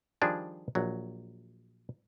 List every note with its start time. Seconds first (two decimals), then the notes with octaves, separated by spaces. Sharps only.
0.22 D#3 F3 G3 D4 G#4
0.75 A#1 F#3